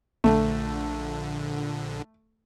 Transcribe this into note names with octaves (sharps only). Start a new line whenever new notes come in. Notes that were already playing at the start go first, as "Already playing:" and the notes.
A#1 D3 A3